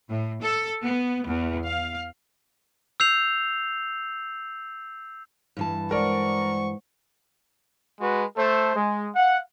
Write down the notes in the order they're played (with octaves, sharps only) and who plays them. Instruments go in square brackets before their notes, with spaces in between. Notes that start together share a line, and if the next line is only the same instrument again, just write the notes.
[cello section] A2
A4
B3
E2
F5
[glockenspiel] E6 G6 C7 F7
[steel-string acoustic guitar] G2 E3 A5
[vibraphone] G#3 C5 F#5 [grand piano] A#4 D5 [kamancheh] C#6
[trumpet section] G#3 F#4 B4
A3 A4 C5
G#3
F5 F#5